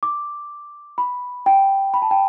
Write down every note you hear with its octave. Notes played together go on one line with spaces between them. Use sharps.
D6
B5
G5
B5
A5
G5